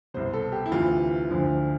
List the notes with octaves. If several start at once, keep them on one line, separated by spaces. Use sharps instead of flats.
C2 B2 C5
A4
G4
E4
D2 C3 E3 F4
D2 D3 F3